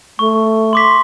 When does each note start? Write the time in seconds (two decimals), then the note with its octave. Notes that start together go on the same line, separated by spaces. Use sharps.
0.19 A3 C#6
0.73 C6 D6 B6